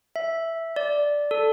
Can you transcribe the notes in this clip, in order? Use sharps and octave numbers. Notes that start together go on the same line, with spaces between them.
E5
D5
A4